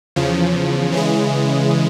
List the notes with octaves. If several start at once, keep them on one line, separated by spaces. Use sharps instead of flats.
E2 C#3 F3
C#3 E3 G#3